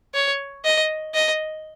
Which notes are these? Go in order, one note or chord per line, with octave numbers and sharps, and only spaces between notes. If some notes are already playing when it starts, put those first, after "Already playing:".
C#5
D#5
D#5